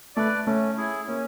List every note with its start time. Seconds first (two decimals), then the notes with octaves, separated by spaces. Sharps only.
0.16 A3 B4 D5
0.46 A3 C#4
0.77 E4 G#4
1.07 A#3 C#4